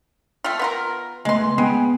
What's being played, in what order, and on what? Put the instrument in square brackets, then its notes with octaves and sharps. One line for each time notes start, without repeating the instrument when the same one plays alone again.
[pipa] A3 C4 F4
B3 F4 A#4
[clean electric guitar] C#2 A3 B3 [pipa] G#3 C6
[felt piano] B3 [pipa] G#4 [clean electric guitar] B4 G5 B5